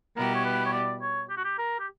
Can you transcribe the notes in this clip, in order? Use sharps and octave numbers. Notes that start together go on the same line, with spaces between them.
B2 G3 B3 E4 G4 A#4
C#5
B4
C#5
D5
C#5
G4
F#4
G4
A#4
G4